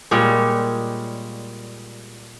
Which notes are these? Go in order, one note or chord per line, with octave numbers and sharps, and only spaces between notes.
A#2 G3 G#3 C#5